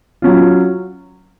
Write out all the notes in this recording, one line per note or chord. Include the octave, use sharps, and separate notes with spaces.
F#3 C#4 F4